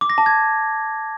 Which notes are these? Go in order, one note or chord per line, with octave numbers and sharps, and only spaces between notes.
D6
A#6
A5
G#6